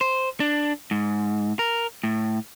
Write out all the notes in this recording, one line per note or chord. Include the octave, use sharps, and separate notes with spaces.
C5
D4
G#2
A#4
A2